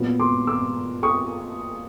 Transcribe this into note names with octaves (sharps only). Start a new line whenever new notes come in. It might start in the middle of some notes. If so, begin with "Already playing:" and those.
Already playing: A#2 F#3 B3
C6 D6
D6 E6
C#6 D#6